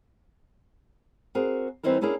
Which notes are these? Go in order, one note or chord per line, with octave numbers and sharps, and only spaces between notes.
C4 F#4 G#4 A#4
E3 G3 C4 D#4 E4 A#4
A#3 C#4 D4 E4 G#4 A#4